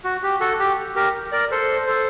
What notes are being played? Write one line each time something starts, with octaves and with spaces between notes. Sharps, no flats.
F#4
G4
F#4 A4
G4
G4 A#4
A#4 D5
A4 C5
A4 C5